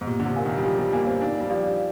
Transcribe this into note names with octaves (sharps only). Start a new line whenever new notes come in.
G#2
A#2 G4
D3
C3
A#4 F5 G#5
D#3
G3
F3 G4
G3
A#3 A#4 F5 G#5
C4
D4 D#4
G3
F3 G4 D5 F5